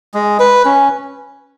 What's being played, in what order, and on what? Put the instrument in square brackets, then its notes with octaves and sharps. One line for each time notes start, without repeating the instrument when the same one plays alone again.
[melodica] G#3
B4
C#4